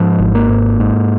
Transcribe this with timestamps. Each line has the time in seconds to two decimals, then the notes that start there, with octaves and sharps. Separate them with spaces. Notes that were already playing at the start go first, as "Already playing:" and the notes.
Already playing: G#2 F3
0.19 G#1
0.35 A#3
0.49 G#2
0.80 G#2